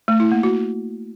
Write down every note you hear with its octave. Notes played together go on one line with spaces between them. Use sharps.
A3
E4
A#3
F#4